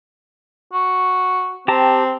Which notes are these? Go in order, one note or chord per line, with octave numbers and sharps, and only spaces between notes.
F#4
C4 G4 A5 A#5